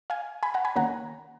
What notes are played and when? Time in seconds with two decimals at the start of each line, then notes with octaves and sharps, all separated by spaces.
0.10 F5 G#5
0.43 G#5 B5
0.54 F#5 A#5
0.65 G#5 B5
0.76 D#3 A#3 C#4 F#5 A#5